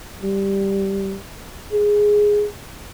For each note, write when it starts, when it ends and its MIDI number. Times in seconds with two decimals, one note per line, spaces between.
0.23 1.16 55
1.73 2.46 68